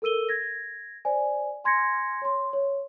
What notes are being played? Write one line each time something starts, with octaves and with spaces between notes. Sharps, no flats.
A4 A#4 E6 D#7 G7
G#6 A#6
C5 D5 G#5
G#5 C6 G#6 A#6 C#7
C#5 C6
C#5